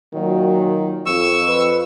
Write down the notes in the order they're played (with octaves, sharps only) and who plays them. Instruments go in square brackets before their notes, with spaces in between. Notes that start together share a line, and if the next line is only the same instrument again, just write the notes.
[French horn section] A#2 F#3 [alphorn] D#3
[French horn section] F2 [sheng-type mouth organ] C#6 E6
[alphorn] B4